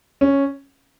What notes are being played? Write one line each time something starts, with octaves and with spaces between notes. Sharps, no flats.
C#4